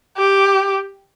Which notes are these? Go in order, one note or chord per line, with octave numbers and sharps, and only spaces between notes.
G4